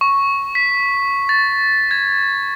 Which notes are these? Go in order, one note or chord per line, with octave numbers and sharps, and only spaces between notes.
C#6
B6
A6
G#6